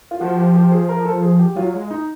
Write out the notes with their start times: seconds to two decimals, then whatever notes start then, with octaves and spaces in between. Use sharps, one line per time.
0.11 F4
0.20 F3 F#4
0.37 G4
0.54 G4
0.72 G#4
0.89 A#4
1.05 A4
1.22 G#4
1.39 G4
1.56 F#3 F4
1.74 G#3
1.90 D#4